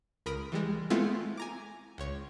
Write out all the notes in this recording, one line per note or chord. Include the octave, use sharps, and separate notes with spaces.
C#2 A#4 B5 D#6 A#6 D7
E3 G3 G#3
G#3 A3 B3 C4 E4 F4
G#5 A#5 D6
C#2 C#5